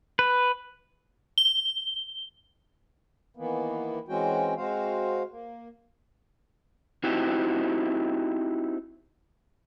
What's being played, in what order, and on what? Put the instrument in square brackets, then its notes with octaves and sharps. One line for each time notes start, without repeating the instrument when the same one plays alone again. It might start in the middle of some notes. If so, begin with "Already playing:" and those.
[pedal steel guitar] B4
[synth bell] G7
[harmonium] D#3 E3 A#3 B3
E3 G#3 C4 C#4 F#4 G5
G#3 C4 F#4 C5 F5
A#3
[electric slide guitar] C4 D#4 E4 F#4 G4